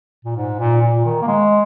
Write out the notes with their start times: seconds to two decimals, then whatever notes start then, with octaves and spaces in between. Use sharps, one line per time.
0.25 A#2
0.36 G#2
0.59 A#2
0.81 A#2
1.05 D#3
1.22 A#3
1.28 G#3